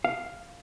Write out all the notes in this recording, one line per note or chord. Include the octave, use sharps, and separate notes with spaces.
F5